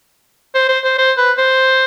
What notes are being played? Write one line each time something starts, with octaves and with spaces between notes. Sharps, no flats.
C5
C5
C5
C5
B4
C5